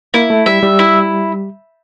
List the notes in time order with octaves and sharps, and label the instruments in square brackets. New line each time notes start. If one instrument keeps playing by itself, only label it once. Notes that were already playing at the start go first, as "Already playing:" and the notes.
[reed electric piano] A#3 [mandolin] E4
[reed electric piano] A3
[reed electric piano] G3 [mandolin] E5
[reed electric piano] G3
[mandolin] E4